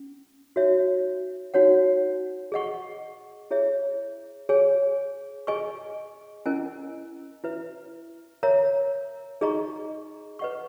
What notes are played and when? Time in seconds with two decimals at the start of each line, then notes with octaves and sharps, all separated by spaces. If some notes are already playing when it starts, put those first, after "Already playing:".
Already playing: C#4
0.56 D#4 F#4 C#5 E5
1.54 D#4 F#4 C#5 F#5
2.52 G#4 D#5 F#5 C#6
3.51 E4 G#4 C#5 E5
4.49 G#4 C#5 G#5
5.47 G#4 D#5 G#5 C#6
6.46 C#4 E4 A#4 D#5 G#5
7.44 E4 B4 E5
8.43 A#4 C#5 E5 A#5
9.41 D#4 G#4 D#5 A#5 C#6
10.39 B4 D#5 F#5 C#6